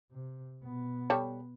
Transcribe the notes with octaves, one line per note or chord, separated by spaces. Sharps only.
C3
B2 B3
G3 A4 C#5